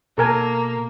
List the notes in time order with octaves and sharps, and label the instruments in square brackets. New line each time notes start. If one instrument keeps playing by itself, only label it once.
[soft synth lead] B2 [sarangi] A#3 [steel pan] A4 A#4 G#5